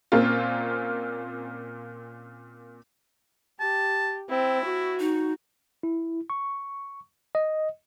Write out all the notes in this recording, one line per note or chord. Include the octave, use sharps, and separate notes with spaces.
A#2 A#3 C4 C#4 F4
G4 A5
C4 E4
F#4
D#4
E4
C#6
D#5